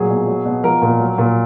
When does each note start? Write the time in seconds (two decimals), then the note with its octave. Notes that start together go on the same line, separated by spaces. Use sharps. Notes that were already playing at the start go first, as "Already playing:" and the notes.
Already playing: A#2 F#3 G#4
0.09 B2
0.27 F#3
0.45 B2
0.64 F3 A#4
0.82 A#2
1.00 F#3
1.18 A#2